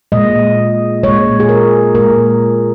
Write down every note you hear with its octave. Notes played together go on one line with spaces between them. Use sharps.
A#2 G#3 D#5
A#2 G#3 C#5
G#4
A#4
A#2 G#3 A#4